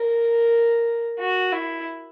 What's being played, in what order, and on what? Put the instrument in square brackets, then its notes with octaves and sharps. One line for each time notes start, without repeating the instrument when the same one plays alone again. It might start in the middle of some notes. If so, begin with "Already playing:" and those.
Already playing: [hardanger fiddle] A#4
F#4
E4